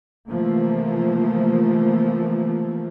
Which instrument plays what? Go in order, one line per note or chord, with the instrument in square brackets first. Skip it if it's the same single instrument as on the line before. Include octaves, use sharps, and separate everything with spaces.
[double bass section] C3 E3 F3 A3 A#3